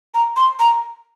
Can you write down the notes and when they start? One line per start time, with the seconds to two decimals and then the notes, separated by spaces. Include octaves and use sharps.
0.14 A#5
0.36 C6
0.59 A#5